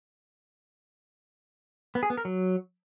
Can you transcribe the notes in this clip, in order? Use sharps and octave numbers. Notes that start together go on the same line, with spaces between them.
B3
G#4
B3
A#4
F#3